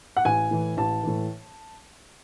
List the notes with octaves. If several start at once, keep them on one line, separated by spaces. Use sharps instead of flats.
F#5
A1 G#5
A2 E3
A1 A5
A2 E3